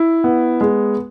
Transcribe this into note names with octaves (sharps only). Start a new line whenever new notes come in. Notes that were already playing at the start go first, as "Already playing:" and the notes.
Already playing: E4
B3
G#3